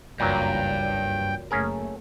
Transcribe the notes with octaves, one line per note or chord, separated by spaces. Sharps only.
F#1 C#2 G2 A#2 E3 F#3 G5
F#1 A3 A#3 C#4 G#4 A#4